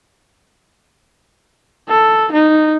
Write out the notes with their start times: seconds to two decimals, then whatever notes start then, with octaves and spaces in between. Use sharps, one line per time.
1.89 A4
2.32 D#4